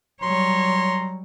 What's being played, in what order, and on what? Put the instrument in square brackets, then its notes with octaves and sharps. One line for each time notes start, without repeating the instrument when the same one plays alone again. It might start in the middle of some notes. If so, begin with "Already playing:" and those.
[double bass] F#3 G3 [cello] C#5 [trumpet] A#5 [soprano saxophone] C6